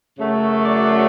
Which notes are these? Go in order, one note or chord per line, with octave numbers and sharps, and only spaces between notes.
F#2 C#3 F#3 A3
D5